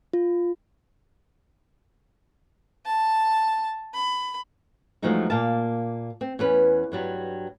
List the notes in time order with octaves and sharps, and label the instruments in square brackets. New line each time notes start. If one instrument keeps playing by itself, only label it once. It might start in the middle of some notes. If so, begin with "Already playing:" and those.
[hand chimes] F4
[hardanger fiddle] A5
B5
[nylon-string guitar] E2 F3 F#3 G#3 A3 D#4
A#2 A#3 F5 A5
C4
E2 C#4 B4
G2 F#3 G3